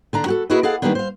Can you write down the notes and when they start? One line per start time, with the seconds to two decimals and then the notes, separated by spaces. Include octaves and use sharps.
0.13 D3 D4 A#5
0.26 F#4 G4 A4
0.50 A#3 E4 F#4 G#4 B4 D#5
0.63 G#4 A4 D5 D#5 F5 F#5
0.82 D#3 F3 G3 A#3 B3 D4
0.95 C5 F5